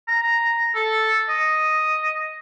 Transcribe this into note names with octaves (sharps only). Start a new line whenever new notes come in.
A#5
A4
D#5